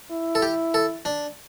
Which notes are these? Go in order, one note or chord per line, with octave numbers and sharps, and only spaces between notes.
E4
A4
G4
A4
D4